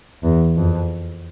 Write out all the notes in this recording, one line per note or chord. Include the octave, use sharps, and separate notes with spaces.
E2
F2